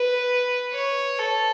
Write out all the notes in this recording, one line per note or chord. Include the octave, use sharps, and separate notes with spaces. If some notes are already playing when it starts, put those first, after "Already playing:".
Already playing: B4
C#5
A4